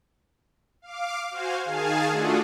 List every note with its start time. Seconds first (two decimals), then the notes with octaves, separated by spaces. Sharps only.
0.82 F5 D6
1.31 F#4 C5 F5 G#5
1.65 D#3 G#4 F5 G#5 A5
2.10 A3 D4 F4 F#4 G#4 A4